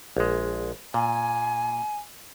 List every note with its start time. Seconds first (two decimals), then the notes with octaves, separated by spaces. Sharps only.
0.17 A#1 G#3
0.94 A#2 G#5